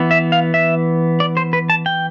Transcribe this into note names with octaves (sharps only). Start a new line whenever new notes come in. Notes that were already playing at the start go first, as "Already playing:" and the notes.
Already playing: E3 B3
E5
F5
E5
D5
C5
B4
A5
G5